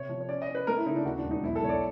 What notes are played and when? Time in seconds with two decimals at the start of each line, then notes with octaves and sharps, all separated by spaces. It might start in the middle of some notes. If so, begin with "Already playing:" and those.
Already playing: C3 C#5
0.09 F3
0.21 C#5
0.29 C#4 D5
0.42 D#5
0.48 C#4
0.55 B4
0.67 A3 A#4
0.77 E4
0.86 C#3 D#4
0.96 D4
1.05 D#2 F#4
1.18 D4
1.24 E1
1.31 D#4
1.43 B1 E4
1.56 A4
1.63 B1 C#5
1.69 D5